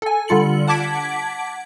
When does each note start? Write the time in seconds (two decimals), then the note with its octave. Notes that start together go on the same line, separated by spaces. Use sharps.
0.02 A4 G#5
0.28 D3 G3 F4 C#7 F#7
0.68 F#5 A5 D6 G#6 B6 D7